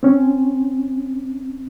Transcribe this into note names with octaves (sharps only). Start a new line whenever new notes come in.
C4 C#4